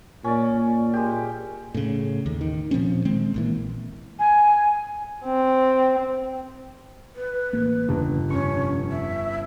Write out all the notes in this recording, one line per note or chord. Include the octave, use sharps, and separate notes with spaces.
A#2 C#4 D5
G#3 G4
A2 C#3
D#2
D#3
A#2 F3 C4 C#4
D#3 G#3 C4
A#1 A#2 E3
G#5
C4
B4
A1 A#3
G1 E2 C#3 D4
F1 C#4 C#6
E5